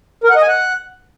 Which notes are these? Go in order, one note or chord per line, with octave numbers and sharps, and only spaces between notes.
A#4
F#5
D#5
G#5
F#5